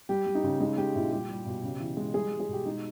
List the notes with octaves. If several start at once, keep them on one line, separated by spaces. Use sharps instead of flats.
G3 G4
G3
D#4
C#3
G#3 D#4
G#3 G4
A#2 E4
G3 G4
G3
B2
C#3
E3
G#3
G3 G#4
G3
G#4
B2 G4
G#3 D#4